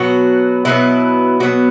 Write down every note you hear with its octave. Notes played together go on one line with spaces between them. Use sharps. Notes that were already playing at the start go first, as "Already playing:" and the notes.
Already playing: B2 F#3 B3 F#4
B2 F#3 B3 E4
B2 F#3 B3 F#4